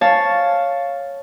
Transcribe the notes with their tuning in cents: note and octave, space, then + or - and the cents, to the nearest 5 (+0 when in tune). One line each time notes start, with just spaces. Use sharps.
C#5 +0 F5 +0 A5 +0